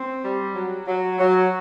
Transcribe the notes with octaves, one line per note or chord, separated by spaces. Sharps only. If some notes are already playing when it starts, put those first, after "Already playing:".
Already playing: C4
G3
F#3
F#3
F#3